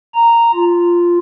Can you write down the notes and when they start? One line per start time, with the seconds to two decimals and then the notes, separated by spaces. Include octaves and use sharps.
0.14 A#5
0.54 F4